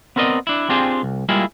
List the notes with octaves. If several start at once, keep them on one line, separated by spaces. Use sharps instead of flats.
B3 C4 A#4 D5 D#5
D4 E4
C4 D4 F4 G4 G#4 C5
C2
G3 G#3 A#3 E4 F4 G#4